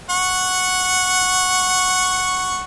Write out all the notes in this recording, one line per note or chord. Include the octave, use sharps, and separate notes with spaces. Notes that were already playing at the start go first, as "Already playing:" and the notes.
F#5 C#6